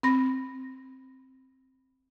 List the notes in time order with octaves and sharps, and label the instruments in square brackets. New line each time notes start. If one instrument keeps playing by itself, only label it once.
[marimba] C4 B5 A#6